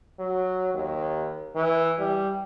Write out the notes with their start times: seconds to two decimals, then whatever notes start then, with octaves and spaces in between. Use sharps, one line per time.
0.19 F#3
0.74 D#2
1.55 E3
1.99 G3